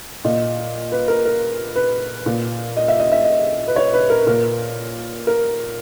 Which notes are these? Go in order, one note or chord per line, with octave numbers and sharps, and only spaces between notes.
A#2 D#5
B4
A#4
A#4
B4
A#2
D#5
E5
D#5
E5
D#5
B4
C#5
B4
A#4
A#2 A#4
A#4